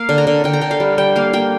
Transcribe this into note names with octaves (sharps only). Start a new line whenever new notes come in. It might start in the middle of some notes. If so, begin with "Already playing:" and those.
Already playing: A#3 F5
D3
A#5
D3
D3 G5
A#5
D3 G5
F5
G3
G3 G5
A#3 F5
A#3 G5